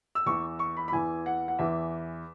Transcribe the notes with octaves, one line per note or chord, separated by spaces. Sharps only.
E6
E2 E3 C#6
C#6
B5
B5
E2 E3 G#5
F#5
F#5
E2 E3 E5